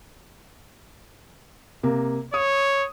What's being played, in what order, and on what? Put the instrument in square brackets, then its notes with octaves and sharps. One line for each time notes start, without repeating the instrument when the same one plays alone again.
[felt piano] C3 A#3
[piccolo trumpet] C#5 [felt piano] D#6